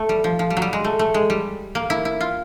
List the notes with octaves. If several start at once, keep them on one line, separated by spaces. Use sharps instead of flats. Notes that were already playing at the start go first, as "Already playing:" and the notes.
Already playing: A3
G3
F3
F3
G3
F#3
G3
G#3
A3
A3
G#3
G3
A#3
E4
E4
F4